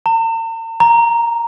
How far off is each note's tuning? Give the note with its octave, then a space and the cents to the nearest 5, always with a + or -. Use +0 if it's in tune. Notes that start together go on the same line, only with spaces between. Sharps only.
A#5 -45
A#5 +0